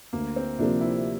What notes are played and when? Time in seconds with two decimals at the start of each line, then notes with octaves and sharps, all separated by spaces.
0.13 D2 A#3
0.36 C4
0.59 C3 F3 A#3 D4
0.81 E4